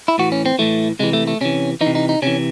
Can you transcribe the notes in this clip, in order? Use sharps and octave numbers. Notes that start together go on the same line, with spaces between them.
E4
A2 E3 F#4
C#4
C4
A2 E3 A3
C3 E3 G#3
A3
A3
C3 E3 C#4
E3 D#4
C3
D#4
D#4
C3 E3 C#4